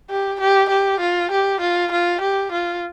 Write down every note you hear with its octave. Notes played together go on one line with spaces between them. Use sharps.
G4
G4
G4
F4
G4
F4
F4
G4
F4